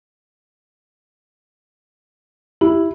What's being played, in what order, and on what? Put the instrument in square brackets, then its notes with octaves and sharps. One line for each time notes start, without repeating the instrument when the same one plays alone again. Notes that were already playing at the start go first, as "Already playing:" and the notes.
[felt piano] E4 [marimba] G4